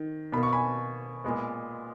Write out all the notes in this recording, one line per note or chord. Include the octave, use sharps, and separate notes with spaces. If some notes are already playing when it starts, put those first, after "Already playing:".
Already playing: D#3
B2 A#3 B5
C#6
G#5 B5
A#2 G#3 B3